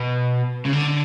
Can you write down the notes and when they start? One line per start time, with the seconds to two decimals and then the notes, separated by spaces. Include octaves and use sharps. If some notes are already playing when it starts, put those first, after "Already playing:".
Already playing: B2
0.65 C#3
0.73 D3